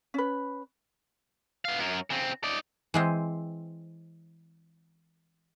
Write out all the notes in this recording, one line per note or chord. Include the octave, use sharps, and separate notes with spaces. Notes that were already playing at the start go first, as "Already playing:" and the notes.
C#4 B4
B3 F5
F#2 A#4
C#3 C4
D#4 D5
E3 G#3 C4